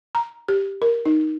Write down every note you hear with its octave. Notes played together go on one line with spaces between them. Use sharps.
A#5
G4
A#4
D#4